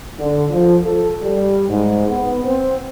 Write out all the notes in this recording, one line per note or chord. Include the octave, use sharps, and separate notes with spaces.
D3
F3
A4
G3
G#2
B3
C4